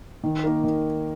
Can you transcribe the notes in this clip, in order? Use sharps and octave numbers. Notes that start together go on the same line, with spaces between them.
D#3
A#3 D#4 A#4
D#3